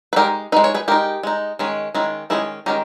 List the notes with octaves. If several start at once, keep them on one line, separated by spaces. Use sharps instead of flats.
B4
G#3 D#4 G4 A#4
G#3 D#4 B4
C#5
G#4 B4
G#3 D#4 G4 A#4
G#3 D#4
D#3 G#3 C#4
D#3 G#3 C#4 E4
D#3 G#3 C#4 E4 G#4
D#3 G#3 C#4 G4 A#4